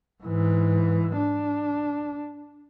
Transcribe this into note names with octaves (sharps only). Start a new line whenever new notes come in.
G#2 E3
D4